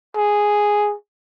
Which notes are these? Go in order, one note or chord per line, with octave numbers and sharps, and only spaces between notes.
G#4